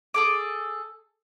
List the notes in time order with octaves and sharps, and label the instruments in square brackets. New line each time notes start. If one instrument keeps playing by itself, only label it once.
[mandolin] G#4 A4 D6